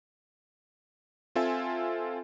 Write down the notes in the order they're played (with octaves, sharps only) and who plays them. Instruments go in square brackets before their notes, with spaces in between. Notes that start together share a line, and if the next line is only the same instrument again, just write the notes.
[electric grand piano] C4 F4 A4 E5 G#5